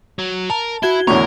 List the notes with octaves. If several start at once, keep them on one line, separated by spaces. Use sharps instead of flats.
F#3
A#4 A5
E4 F#4 G#6 G7
E2 A2 D3 A#4 C#5 C#6